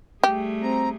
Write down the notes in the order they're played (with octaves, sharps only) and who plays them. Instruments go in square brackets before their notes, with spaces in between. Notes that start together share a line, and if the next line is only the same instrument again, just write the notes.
[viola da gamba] G3 A3 G#4 [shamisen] G4
[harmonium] C4 A#5